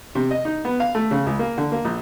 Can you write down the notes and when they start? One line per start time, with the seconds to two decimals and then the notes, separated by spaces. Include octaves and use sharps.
0.15 C3
0.31 D#5
0.45 D#4
0.65 B3
0.80 F5
0.95 A3
1.11 C#3
1.26 C#2
1.39 A#3
1.58 D3
1.72 A#3
1.85 A#1